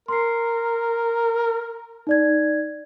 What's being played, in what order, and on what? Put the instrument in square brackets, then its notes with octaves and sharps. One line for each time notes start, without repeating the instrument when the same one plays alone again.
[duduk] A#4 [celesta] C6 C7
[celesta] D#4 D5 G#6